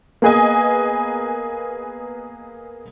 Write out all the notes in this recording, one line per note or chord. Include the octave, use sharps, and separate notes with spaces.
A#3 B3 G#4 B4 D#5 G#5